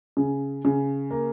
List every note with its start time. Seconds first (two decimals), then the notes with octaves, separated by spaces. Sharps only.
0.17 C#3
0.65 C#3
1.11 A#3